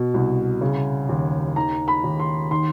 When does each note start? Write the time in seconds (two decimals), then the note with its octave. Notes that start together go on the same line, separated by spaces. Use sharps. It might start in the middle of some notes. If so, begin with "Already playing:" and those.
Already playing: B2
0.14 C2
0.61 C#3
1.09 D#2
1.56 D#3 A#5
1.88 B5
2.04 D#2
2.20 C6
2.51 D#3 C6